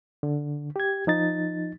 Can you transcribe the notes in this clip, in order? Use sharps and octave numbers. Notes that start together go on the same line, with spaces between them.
D3
G4 G#6
F3 D#4 A6